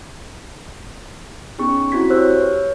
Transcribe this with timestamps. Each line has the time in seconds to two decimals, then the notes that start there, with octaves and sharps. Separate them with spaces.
1.58 B3 C#4 D#4 G#4 C#6
1.92 C4 E4 F#4 G#6 B6
2.10 G4 C5 C#5 E6 F#6
2.37 B4 C#5